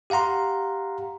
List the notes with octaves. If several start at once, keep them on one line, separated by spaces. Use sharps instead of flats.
G4 F5 F#5 A#5 C6